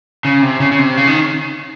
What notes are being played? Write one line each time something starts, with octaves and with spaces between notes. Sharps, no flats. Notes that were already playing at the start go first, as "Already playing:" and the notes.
C#3
C3
C#3
C#3
C3
C#3
D#3